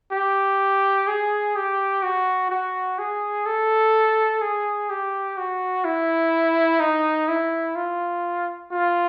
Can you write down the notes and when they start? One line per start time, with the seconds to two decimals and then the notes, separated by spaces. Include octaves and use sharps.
0.12 G4
1.07 G#4
1.55 G4
2.03 F#4
2.50 F#4
2.99 G#4
3.46 A4
4.41 G#4
4.90 G4
5.37 F#4
5.84 E4
6.80 D#4
7.28 E4
7.75 F4
8.72 F4